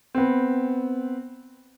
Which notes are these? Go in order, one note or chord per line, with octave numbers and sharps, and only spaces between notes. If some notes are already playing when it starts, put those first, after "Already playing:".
B3 C4